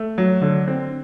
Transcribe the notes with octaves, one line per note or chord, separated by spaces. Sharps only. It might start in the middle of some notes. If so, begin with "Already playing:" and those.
Already playing: A3
F#3
D3
C4